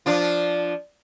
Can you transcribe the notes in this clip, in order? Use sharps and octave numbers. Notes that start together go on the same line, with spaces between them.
F3 D4 F4